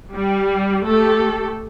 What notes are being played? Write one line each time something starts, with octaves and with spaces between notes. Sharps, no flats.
G3
A3 G4 A4